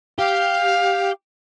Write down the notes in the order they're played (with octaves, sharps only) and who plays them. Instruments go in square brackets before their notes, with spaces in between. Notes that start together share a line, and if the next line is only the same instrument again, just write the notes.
[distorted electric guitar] G4 [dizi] F5